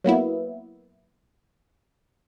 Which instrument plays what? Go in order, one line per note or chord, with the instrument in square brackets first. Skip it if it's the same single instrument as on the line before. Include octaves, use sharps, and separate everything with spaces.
[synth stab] F#3 A#3 B3 E4